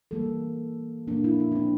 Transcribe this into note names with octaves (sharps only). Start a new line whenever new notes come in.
E3 G3 A#3 A4
A#2 F3 A#3 D4
E4
D4
D4
C4